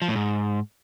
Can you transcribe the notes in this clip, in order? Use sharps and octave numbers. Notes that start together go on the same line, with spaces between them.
F3
A2
G#2